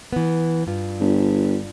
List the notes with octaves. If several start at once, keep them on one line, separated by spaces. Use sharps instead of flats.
E3 B3
G2 F4
G1